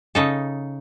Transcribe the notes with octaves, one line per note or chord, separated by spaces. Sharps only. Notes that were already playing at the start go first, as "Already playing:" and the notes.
C#3 D#4 A4